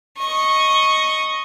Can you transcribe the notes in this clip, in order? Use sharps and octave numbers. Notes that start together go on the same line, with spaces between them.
D#5 C#6